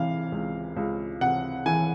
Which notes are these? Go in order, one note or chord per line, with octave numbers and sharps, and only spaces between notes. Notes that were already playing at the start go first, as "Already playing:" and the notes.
Already playing: C3 E3 F5
C#2
C#2
C3 F#5
E3 G#5